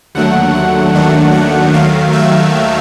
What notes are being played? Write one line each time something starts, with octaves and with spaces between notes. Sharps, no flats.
D#2 D3 F#3 A3 F#5
F#5
D#2 D#3 F#3 A3 D4
F#5
D#2 D#3 F#3 A3 F5
E5